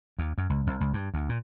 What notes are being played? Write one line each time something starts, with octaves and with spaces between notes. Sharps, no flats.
D#2
F#2
C#2
C2
C#2
G2
D2
A#2